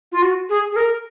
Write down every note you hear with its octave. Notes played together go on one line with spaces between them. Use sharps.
F4
F#4
G#4
G#4
A#4